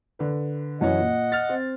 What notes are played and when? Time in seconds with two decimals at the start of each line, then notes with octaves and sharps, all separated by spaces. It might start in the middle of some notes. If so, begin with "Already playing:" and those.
0.19 D3 B4
0.81 F#2 E3 C#4 D#5 F#5
0.99 A#2
1.32 F6 A6
1.49 C4